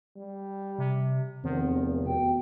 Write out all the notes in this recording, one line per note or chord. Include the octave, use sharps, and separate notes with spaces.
G3
C3
F1 E2 D#3 C4
B2 G5